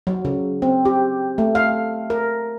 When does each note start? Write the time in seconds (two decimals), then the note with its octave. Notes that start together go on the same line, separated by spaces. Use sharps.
0.07 F#3
0.25 C#3
0.62 C4
0.85 G4
1.38 A3
1.55 F5
2.10 A#4